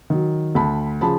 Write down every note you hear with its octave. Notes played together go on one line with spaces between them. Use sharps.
D#3 F#3
D2 A5 B5
C#3 F3 A5 B5